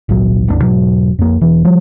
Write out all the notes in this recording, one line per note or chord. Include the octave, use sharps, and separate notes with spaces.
G#1 C#2 A#2 F#3
A1 E2 A3 D4
E1 G#2 B2 F#3
F2 A#3
E1 E3
F3 G3